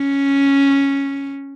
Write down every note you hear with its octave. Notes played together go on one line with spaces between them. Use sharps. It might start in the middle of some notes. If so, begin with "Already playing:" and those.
Already playing: C#4